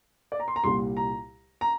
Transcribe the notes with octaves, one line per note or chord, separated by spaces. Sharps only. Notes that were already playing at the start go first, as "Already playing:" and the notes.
D5
A#5
C6
A#5
C2 A#2 G3 C6
A#5
A#5